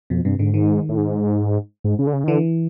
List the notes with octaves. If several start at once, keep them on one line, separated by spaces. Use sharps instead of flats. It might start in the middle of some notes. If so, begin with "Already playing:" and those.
F2 B2
G2 C3
G#2 D3
D#3
A2
G#2
G#2
C#3
D3
C#3
D#3
D3 E3